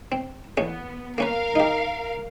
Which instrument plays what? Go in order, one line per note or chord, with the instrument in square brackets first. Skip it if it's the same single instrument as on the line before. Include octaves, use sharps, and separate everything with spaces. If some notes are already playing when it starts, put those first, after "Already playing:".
[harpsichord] C4
[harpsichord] A1 C#4 D#6 [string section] B3
[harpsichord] A#3 C#4 B4 [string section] A#4 F5
[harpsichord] D#4 G4